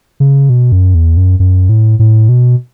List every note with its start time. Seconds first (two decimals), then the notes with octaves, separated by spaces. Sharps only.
0.20 C#3
0.50 B2
0.72 F#2
0.95 E2
1.17 F#2
1.40 F#2
1.69 A2
1.99 A2
2.29 B2